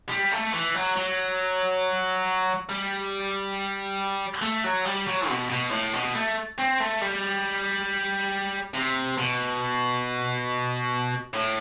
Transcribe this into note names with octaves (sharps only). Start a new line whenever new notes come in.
G3
A3
E3
F#3
F#3
G3
A3
F#3
G3
F#3
B2
B2
A2
B2
A3
C4
A3
G3
C3
B2
A2